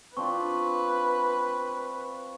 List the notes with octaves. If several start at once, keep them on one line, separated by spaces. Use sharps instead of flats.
C4 D4 F4 B4 C#6